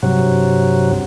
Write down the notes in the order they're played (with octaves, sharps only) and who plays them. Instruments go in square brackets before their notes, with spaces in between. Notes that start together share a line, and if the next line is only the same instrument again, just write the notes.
[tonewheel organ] G2 C3 F#3